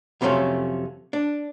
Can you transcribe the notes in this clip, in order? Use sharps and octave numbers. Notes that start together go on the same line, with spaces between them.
F2 C3 F3 F#3 A3 C#4
D4